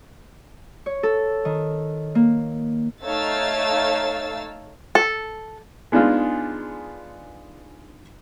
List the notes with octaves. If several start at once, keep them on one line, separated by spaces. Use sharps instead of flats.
C#5
A4
D#3
A#3
A3 D#4 C#5 F5 E6 A6
A4
G#3 B3 D4 D#4 F4